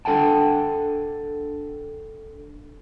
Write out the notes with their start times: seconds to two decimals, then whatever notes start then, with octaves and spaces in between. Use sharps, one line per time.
0.05 D4 A4 F#5 G5 A5